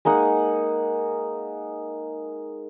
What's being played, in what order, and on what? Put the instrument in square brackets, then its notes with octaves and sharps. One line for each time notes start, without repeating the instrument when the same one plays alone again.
[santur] G#3 A#3 D#4 F#5